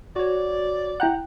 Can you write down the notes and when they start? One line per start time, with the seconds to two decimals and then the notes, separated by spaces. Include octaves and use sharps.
0.16 F#4 C#5 D5
1.00 E4 F#5 G5 A#5 F#6